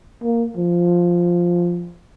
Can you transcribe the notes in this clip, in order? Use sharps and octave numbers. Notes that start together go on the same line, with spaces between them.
A#3
F3